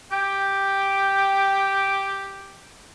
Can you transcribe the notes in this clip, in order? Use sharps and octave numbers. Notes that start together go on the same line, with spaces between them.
G4 G5